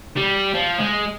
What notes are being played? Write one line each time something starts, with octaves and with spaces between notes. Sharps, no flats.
G3
F3
G#3